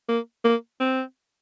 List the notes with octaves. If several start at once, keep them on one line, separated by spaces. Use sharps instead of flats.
A#3
A#3
C4